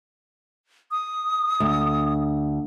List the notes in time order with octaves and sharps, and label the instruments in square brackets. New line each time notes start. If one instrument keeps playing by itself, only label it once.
[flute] D#6
[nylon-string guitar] D2